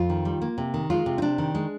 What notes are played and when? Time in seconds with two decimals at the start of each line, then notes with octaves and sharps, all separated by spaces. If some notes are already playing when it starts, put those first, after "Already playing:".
Already playing: F2 F4
0.09 D#3
0.25 G3
0.42 A#3
0.58 C3
0.74 D#3
0.90 G#3 F4
1.06 C3
1.18 D#4
1.22 C3 D4
1.38 D#3
1.55 G#3